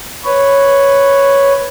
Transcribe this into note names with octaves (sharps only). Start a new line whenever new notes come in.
B4 C#5